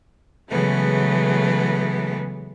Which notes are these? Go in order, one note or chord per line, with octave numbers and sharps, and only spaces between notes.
C#3 E3 F#3 G#3 A3 B3